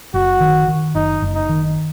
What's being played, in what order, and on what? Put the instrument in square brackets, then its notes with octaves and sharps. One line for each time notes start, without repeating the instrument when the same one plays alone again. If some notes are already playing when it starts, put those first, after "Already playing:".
[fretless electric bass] F#1 [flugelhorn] F#4
[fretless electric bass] D#3
D#3
[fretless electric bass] F#1 [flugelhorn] D#4
[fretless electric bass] F#1
[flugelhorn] D#4
[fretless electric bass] D#3